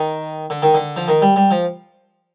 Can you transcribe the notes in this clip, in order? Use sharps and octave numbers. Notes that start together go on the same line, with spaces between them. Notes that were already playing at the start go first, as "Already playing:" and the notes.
Already playing: D#3
D3
D#3
D3
F3
D#3
G3
G3
F3